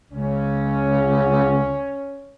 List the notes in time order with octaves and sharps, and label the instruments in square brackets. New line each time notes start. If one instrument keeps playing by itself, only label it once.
[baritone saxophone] C#2 [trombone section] C#4